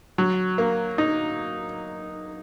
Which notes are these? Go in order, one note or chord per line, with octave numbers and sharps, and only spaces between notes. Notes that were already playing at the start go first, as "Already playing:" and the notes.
F#3
A#3
D#4